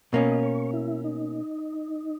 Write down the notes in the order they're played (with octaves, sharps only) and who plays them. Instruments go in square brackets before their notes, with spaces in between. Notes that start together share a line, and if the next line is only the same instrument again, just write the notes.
[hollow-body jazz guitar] B2 A#3 C#4 [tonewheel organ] D#5
[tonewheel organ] C#5
E4
D#4